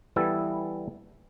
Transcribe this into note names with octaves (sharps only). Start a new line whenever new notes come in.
E3 G3 B3 E4 A4